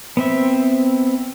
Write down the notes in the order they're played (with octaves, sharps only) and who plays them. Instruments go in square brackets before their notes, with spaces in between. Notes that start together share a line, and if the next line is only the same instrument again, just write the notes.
[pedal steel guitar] B3 C4 E5